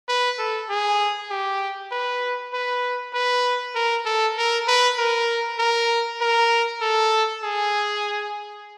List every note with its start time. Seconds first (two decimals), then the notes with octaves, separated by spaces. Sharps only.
0.09 B4
0.38 A4
0.69 G#4
1.30 G4
1.92 B4
2.53 B4
3.14 B4
3.75 A#4
4.06 A4
4.37 A#4
4.68 B4
4.98 A#4
5.59 A#4
6.21 A#4
6.81 A4
7.44 G#4